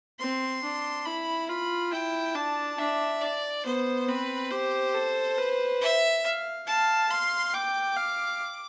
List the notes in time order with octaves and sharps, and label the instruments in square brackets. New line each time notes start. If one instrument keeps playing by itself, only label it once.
[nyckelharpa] C4 [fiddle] C6
[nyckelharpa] D4
[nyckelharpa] E4 [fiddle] B5
[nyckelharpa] F4 [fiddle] B5
[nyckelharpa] E4 [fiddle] G5
[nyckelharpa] D4 [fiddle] A5
[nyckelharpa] D4 [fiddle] E5
[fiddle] D5
[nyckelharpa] B3 [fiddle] C5
[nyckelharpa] C4 [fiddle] B4
[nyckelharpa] G4 [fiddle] C5
[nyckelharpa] A4
B4
[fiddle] E5
[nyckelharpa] F5
[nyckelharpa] F5 [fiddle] A5
[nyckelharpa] F5 [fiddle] C6
[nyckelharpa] G5 [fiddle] D6
[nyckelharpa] F5